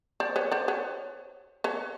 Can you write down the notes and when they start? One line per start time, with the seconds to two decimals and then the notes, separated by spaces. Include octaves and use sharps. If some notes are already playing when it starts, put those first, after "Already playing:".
0.20 C5 D5
0.36 B4 C#5
0.52 C5 D5
0.68 B4 C#5
1.64 B4 C#5